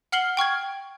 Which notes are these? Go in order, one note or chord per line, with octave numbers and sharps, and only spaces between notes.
F#5 F6 C7 F#7 G7
G5 C#6 F6 G#6